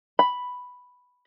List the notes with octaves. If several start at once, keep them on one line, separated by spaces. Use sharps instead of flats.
B5